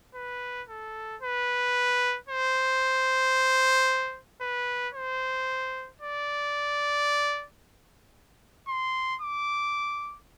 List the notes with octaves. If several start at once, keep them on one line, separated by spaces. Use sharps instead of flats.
B4
A4
B4
C5
B4
C5
D5
C6
D6